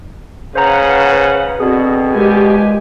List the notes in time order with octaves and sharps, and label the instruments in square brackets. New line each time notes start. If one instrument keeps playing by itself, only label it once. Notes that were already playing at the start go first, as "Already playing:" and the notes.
[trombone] C#3 [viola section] B4 F5 F#5 [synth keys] C5 A#5
[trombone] B2 [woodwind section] D3 C4 [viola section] F#4 [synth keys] G#4
[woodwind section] A#2 D#3 G#3 [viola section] G4 G#5